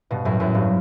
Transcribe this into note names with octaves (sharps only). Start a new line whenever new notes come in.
G2 B2
F#2 A2
F#2 A2
G2